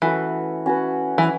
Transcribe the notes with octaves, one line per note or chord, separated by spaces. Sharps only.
E3 A3 C#4 F#4 B4
C#4 F#4 B4
E3